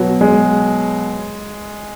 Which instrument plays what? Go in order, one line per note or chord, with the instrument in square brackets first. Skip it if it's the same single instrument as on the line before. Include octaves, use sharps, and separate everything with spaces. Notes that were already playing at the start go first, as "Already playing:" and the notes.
Already playing: [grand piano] B2 F#3 B3
[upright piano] G#3